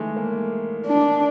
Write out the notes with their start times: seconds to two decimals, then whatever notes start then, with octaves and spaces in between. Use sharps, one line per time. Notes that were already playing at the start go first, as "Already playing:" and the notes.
Already playing: D#3 E3 G#3 A3
0.16 A#3
0.87 D4